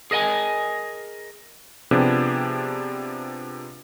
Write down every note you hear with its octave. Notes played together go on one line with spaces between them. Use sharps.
G#4 A#4 D#5 G5 G#5
C3 F3 B3 D4 G4 G#4